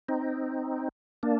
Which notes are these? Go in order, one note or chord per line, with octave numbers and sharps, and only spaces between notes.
C4 D#4
A#3 D4